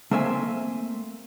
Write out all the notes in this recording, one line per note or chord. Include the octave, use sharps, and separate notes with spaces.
A3 A#3 C4 E5 G#5